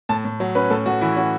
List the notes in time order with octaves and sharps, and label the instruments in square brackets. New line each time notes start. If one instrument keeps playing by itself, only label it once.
[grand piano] A2 A5
A2
F#3
C#4 B4
A2 A4
A2 F#4
E3 E4
C#4 F#4